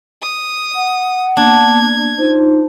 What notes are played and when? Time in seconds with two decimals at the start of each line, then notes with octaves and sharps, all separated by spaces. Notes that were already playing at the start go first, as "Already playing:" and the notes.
0.22 D#6
0.75 F#5
1.37 A#3 B3 D4 G#6
2.19 D#4 F4 C5